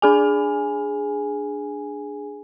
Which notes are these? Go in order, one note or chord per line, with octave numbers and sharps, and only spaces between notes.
D4 G#4 G#5